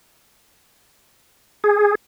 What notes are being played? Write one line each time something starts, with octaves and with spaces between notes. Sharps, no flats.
G#4